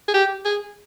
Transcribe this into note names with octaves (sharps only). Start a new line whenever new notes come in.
G#4
G4
G#4